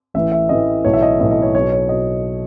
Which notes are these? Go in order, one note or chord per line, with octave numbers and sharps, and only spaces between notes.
A1 A2 E3 E5
E5
A1 A2 E3 D#5
B1 A2 E3 C#5
E5
D#5
B1 A2 E3 D#5
D#5
C#5
B1 B2 C#5
C#5
B2 D#5